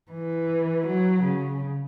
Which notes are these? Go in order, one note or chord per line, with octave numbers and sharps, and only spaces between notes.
E3
F#3
C#3